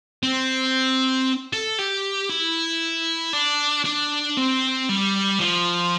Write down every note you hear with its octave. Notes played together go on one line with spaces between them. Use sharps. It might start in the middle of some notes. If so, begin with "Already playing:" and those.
C4
A4
G4
E4
D4
D4
C4
G3
F3